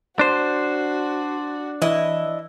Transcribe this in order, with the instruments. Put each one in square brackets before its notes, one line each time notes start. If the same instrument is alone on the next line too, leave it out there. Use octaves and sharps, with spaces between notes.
[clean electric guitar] D4 C5 [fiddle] F#4
[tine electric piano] E3 [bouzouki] E4 D#5